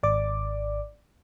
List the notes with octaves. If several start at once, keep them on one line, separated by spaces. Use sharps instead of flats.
G#1 D5 D6